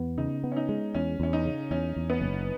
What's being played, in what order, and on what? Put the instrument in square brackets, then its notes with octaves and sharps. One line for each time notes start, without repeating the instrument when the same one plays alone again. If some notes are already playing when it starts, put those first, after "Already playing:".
Already playing: [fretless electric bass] E2 B3
[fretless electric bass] C#3 [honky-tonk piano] D#4
[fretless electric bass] B3
[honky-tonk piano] C#4
D#4
[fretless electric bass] G#3
[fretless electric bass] E2 [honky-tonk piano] C#4
[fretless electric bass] E2 [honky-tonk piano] C#4
[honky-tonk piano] D#4
[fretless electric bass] C#3
[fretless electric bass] E2 [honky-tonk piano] C#4
[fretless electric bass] E2
[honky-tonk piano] B3
[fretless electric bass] F#1